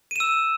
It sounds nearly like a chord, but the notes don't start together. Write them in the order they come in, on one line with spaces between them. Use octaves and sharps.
D#7 E7 E6